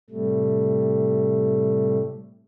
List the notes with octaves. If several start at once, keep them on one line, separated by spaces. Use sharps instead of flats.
A2 C3 G3 A3